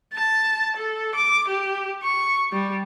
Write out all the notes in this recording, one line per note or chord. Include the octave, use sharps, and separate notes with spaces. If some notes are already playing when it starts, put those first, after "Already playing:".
A5
A4
D6
G4
C#6
G3